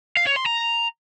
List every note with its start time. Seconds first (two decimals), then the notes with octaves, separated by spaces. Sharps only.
0.17 F5
0.27 C#5
0.36 C6
0.46 A#5